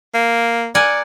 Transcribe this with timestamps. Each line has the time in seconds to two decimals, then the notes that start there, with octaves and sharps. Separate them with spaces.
0.14 A#3
0.75 A#4 D5 F#5 G#5